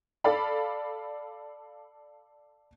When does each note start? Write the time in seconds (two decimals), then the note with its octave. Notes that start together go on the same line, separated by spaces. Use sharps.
0.24 A4 D5 F5 B5